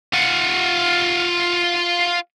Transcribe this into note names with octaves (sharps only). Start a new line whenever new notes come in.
F4 F#5